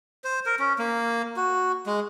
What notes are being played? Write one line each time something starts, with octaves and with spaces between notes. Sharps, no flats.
C5
A#4
C#4
A#3
F#4
G#3